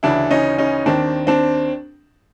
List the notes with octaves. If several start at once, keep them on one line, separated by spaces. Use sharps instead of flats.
D2 C#3 E3 D4 E4
C#4 D#4
C#4 D#4
D#2 D#3 C4 D4
C4 D4